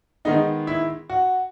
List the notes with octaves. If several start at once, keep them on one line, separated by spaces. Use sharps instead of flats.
D#3 G#3 B3 D#4
E4
F#4